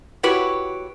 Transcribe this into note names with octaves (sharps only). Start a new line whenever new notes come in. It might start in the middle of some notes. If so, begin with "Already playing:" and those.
E4 F#4 G4 B4 C#5